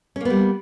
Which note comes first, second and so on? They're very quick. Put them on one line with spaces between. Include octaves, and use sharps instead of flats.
C#4 A#3 B3 G3